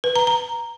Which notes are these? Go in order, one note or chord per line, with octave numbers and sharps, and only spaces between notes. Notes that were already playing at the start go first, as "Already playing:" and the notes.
B4
A#5
A#5